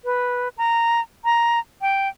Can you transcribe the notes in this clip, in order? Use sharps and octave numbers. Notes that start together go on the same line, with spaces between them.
B4
A#5
A#5
G5